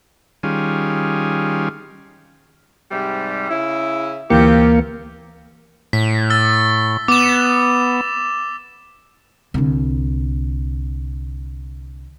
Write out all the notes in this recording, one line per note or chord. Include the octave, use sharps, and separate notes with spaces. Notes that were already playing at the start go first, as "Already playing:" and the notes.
D#3 G3 C#4 F4 G#4
G#2 C3 G3
C#3 E4
D2 E3 A#3 C4 F4 G4 C#7
A2 B6
E6 A6
B3 D6 E7
C2 D3